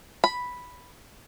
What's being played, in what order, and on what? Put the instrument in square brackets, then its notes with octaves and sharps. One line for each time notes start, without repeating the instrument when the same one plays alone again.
[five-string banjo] B5